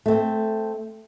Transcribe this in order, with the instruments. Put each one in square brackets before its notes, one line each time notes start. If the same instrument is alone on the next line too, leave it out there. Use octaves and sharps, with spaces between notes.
[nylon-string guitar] A3 C4